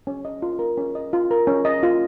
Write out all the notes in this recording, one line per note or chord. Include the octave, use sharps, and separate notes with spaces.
C#4
D#5
F4
A#4
C#4
D#5
F4
A#4
C#4
D#5
F4